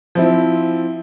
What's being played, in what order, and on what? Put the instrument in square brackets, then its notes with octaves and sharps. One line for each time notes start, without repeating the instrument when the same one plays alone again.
[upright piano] F3 C4 E4